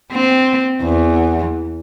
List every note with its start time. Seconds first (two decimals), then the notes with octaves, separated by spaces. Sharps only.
0.13 C4
0.82 E2